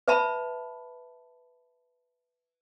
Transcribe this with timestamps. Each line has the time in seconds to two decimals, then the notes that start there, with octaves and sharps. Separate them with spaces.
0.08 B4 E5 A5 B5